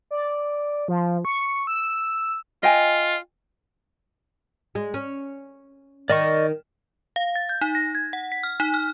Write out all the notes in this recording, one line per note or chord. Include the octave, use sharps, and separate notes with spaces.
D5
F3
C#6
E6
F4 D#5 G5 G#5
G#3
C#4
D#3 D5 D#5 C#6
F5
A6
G6
D#4
A#6
G#6
F#5
B6
F6
D#4
F6